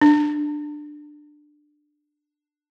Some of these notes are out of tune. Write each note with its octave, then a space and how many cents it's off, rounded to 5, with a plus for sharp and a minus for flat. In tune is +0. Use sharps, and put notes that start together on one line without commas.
D4 +15